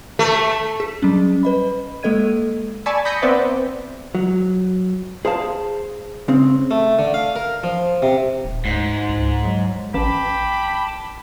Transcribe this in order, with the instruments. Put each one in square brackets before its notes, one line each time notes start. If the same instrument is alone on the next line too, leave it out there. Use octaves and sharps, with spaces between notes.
[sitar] A3
[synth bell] G#4 B6
F#3 G3 C#4
B4 D#5 B5
G#3 A#3 A4 D#5 G#6 D#7
[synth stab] D5 G#5 A5 B5 C#6 E6
B5 D#6 G6 A#6 B6 C#7
B3 C4 B4 C5 D5 E5
[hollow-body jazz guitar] F#3
G#4 C5 F5 A5
C#3 C4
[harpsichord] A3
D3
F5
A#4
F3
C3
[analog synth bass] D#1
[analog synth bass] D2 [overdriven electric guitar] G#2
[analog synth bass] C#2
F#3
[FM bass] A1 [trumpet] G5 [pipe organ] A5 D6 [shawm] B5